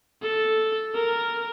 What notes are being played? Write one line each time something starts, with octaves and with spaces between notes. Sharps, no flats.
A4
A#4